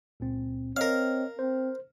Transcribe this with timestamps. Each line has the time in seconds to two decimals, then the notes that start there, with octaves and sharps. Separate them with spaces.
0.20 C#2 A#2 C4
0.77 C4 A#4 C#5 D#5 F5
1.39 C4 C5